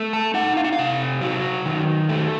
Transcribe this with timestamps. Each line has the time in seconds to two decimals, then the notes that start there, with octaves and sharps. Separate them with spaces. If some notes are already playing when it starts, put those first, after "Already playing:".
Already playing: A3
0.13 A5
0.34 D#4 F#5
0.57 F5
0.64 F#5
0.73 F5
0.79 C3
1.21 F#3
1.66 D#3
2.09 A3